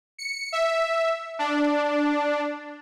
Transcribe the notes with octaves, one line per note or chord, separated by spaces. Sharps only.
C#7
E5
D4